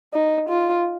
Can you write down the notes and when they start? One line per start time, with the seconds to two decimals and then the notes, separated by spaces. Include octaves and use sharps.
0.13 D#4
0.49 F4